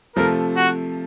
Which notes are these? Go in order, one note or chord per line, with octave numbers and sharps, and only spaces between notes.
C3 F3 A3 A#4
F#4